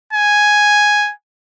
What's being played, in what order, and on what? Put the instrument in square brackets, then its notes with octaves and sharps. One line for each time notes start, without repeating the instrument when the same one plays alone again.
[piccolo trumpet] G#5